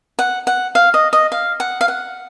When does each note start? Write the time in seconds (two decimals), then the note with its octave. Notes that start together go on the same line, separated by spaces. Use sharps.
0.19 F#5
0.47 F#5
0.75 F5
0.94 D#5
1.13 D#5
1.32 F5
1.60 F#5
1.81 F5
1.88 F#5